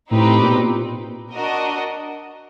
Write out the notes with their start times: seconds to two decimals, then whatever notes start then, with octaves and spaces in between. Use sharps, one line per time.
0.10 A2 C4 D#4 G4 B4
0.41 A#2
0.50 B2
0.59 A#2
1.34 D4 F#4 A#4 D#5